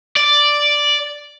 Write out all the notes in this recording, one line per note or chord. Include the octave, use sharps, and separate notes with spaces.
D5